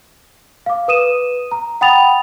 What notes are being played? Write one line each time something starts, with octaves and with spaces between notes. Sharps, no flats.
F5 D6
B4 D#6 D#7 E7
A#5
F#5 G5 B5 D#6 A6 F7